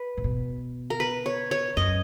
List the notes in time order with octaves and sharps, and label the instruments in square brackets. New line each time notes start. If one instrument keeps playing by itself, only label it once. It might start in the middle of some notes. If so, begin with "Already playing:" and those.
Already playing: [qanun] B4
[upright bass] A#2
B2
[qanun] A#4
B4
C#5
C#5
[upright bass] F#2 [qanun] D#5